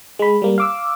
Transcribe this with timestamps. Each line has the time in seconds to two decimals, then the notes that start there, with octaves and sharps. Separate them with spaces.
0.19 G#3 B5
0.42 G3 A#3
0.58 F5 D6 E6